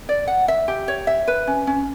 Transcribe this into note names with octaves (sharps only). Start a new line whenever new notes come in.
D5
F#5
E5
G4
C#5
E5
B4
C#4
C#4